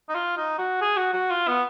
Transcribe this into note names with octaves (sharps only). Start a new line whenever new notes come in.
D#4
F4
D#4
F#4
G#4
F#4
F#4
F4
B3